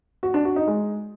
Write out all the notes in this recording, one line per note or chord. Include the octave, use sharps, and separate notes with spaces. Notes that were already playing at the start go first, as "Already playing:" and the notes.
F#4
D4
F#4
D#4
G#3